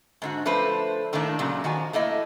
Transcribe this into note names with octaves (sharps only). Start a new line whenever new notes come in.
G#2 D3 F#4
F3 A3 D4 B4 C5
A2 D#3 A3 A#3 D4
A#2 C#3 F#3
D#3 F3 F#4 G#5
A3 A#3 E4 D#5